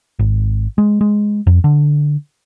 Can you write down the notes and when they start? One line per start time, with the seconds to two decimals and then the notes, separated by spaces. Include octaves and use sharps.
0.19 G#1
0.78 G#3
1.01 G#3
1.47 F2
1.64 D3